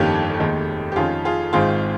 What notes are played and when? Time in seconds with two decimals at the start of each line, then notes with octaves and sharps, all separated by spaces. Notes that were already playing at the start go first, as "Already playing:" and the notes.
Already playing: G1 F2 D#3 A#3 C#4 G4
0.39 F1 D#2 D#3 G#3 D#4
0.92 G4
0.96 F2 D#3 G#3 C#4 F4 G#4
1.25 F4 G#4
1.53 G#1 G#2 D#3 G#3 C4 F4 G#4